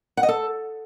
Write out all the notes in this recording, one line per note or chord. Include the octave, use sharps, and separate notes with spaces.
F#5
D#5
A4